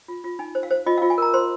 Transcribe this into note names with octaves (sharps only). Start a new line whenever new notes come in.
F4
F4
D#4 G#5
C5
F5
C5
F4 D#5
F5
F4
G#5
A#4 A#5
C5 C6